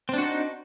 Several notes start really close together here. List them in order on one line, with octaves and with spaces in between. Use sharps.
C4 D4 F#4 D#4